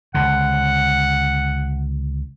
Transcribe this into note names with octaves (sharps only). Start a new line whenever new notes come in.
C#2 D3 F#5